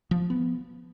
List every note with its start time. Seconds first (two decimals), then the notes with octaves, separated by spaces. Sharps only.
0.11 F3
0.30 B3